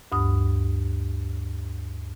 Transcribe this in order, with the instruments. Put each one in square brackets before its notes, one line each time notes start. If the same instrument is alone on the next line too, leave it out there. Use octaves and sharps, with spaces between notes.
[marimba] D2 G2 D#6